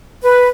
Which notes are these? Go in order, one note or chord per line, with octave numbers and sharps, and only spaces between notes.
B4